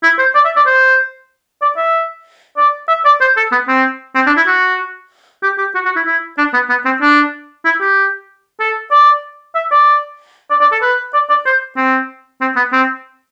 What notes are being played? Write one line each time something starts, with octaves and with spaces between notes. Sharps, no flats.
E4
C5
D5
E5
D5
C5
D5
E5
D5
E5
D5
C5
A4
B3
C4
C4
D4
E4
F#4
G4
G4
F#4
F#4
E4
E4
D4
B3
B3
C4
D4
E4
G4
A4
D5
E5
D5
D5
D5
A4
B4
D5
D5
C5
C4
C4
B3
C4